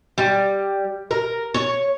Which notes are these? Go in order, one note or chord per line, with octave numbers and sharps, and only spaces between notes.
G3
A#4
C#5